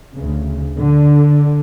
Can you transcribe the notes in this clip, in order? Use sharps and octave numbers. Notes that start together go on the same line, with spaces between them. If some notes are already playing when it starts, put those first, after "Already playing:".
D2 C#3
D3